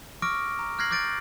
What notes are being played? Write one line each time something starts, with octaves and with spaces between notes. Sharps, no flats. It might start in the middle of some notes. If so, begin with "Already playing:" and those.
C#6 D6 E6 F6 A#6 D7
A#5
F6 F#6 G#6 A#6 C7 F#7
D6 F6 G6 A6 D7